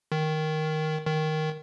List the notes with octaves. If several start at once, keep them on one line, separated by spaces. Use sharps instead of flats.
D#3
D#3